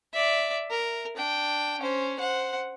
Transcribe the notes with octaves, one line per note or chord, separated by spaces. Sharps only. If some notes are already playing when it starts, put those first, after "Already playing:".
D5 E5
A#4
D4 G5
C#4 C5
C5 F#5